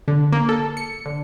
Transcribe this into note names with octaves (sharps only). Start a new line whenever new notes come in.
D3
A#3
A4
C#7
D3